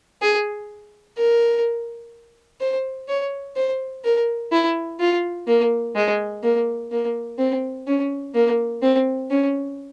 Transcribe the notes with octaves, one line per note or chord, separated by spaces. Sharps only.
G#4
A#4
C5
C#5
C5
A#4
E4
F4
A#3
G#3
A#3
A#3
C4
C#4
A#3
C4
C#4